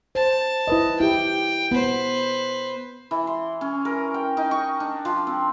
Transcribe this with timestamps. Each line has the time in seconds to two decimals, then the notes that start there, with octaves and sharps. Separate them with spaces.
0.15 C5 A5
0.68 E4 B4 D#5
1.00 E4 G4 G5
1.71 B3 B4 C5
3.11 E3
3.27 C6
3.61 C#4
3.85 A#4
4.14 G5
4.37 D#4
4.51 C#6
4.80 D4
5.05 F3
5.27 C4